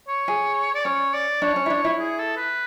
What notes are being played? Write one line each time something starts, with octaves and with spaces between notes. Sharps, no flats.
C#5
G#4
D5
C#4 C#5
D5
D4 C#5
C#4
E4
D4
E4
G#4
A4
B4